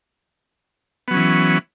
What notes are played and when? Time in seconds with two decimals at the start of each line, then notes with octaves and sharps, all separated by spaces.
1.08 B3
1.11 F#3
1.14 C#4
1.17 E3